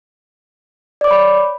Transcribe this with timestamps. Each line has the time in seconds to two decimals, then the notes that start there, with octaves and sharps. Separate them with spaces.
1.01 D5
1.04 D6
1.07 C#5
1.11 B5